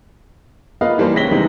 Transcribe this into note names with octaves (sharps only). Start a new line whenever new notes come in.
A#3 F4 B4 D#5 F5
E3 G3 A#3 C5
C#2 C#5 A#6 B6 G7
C3 D#3 E3 G3 G#3 B3